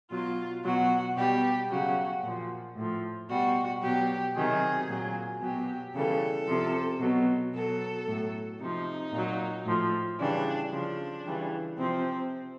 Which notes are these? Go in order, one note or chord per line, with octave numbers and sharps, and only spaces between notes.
B2 F#3 F4
B2 F#3 F#4
B2 G3 G4
C#3 F#3 F#4
A#2 F3
A2 F3
B2 G3 F#4
B2 F#3 G4
C3 D#3 F#3 G#4
A#2 F#3
B2 F#3 G4
C#3 E3 G3 A4
C3 F3
B2 F#3
B2 F#3 A4
A2 F#3
C3 F3 D#4
A#2 F#3
A2 F3
C#3 E3 G3 D4
C#3 F3 D4
C#3 E3 G3
C3 F3 C4